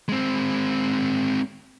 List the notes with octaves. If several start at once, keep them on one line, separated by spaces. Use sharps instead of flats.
G#3 C4